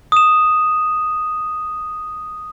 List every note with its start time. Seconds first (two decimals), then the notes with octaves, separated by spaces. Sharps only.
0.12 D#6 E7